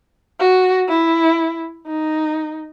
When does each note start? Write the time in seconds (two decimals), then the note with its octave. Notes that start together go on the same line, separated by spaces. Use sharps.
0.40 F#4
0.88 E4
1.87 D#4